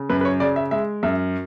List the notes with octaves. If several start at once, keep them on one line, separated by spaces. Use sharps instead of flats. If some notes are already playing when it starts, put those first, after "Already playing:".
Already playing: C#3
F#2 B4
B4
C#5
C#3 D5
E5
G#3 E5
F#2 E5